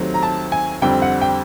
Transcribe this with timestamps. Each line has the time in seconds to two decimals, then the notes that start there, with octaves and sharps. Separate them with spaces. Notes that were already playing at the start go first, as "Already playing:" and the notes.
Already playing: D#2 D#3 F#3 A3 C4
0.14 A#5
0.23 A5
0.52 G#5
0.82 F2 D3 G3 C4 G5
1.02 F#5
1.21 G5